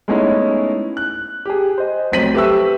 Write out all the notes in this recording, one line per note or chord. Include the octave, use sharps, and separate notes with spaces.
G#3 A3 B3 C#4 D#4 E4
F#6
G4 G#4
C5 D#5
F1 B1 C4 B6 D#7 F#7
G4 A4 B4 E5 C#6 E6